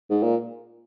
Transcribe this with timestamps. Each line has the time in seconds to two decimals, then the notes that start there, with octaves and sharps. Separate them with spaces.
0.10 G#2
0.23 A#2